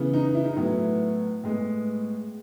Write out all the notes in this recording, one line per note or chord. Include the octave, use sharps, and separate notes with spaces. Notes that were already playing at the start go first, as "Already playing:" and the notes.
Already playing: C#3 E3 B3
D#4
E4
D#4
A2 F#3 B3 E4
A2 G#3 B3